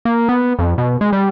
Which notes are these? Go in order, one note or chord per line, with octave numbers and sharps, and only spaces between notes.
A#3
B3
F2
B2
G#3
G3